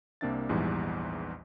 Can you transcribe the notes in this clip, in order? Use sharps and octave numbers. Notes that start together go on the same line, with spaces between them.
C2 A#3 C4 D4 E5 A6
A#1 E2 G#2 E3 G3